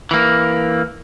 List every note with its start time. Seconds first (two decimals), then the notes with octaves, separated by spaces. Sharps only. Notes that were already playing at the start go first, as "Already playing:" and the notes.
0.11 E3 A#3